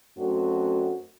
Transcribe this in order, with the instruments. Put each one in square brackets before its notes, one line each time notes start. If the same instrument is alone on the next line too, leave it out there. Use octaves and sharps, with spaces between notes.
[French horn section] F#2 A3 C4 D4 F#4